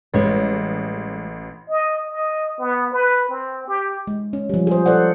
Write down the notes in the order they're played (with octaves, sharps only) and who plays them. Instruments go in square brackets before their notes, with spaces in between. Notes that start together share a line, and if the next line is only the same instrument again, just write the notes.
[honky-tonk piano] A1 [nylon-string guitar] G3 G#3 C#5
[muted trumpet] D#5
D#5
B3
B4
C4
G4
[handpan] G#3
C#4
F3 G3
G#4 C5
A4 C5 D5 F#5